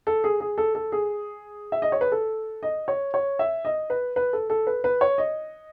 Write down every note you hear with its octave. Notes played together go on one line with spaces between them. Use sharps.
A4
G#4
G#4
A4
A4
G#4
E5
D#5
C#5
B4
A4
D#5
C#5
C#5
E5
D#5
B4
B4
A4
A4
B4
B4
C#5
D#5